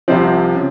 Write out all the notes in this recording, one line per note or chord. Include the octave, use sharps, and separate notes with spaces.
C2 C3 F3 C4
C#3